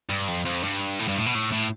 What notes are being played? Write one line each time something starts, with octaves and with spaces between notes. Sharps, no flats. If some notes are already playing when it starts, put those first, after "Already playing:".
G2
F2
F2
G2
A2
G2
A2
B2
A2
A2